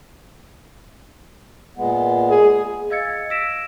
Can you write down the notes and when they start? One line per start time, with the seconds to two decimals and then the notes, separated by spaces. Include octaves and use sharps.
1.77 A#2 G#3 B3
2.29 G#4
2.90 D#5 F5 E6 G#6 A6 C#7
3.30 E6 A#6 B6 D7 E7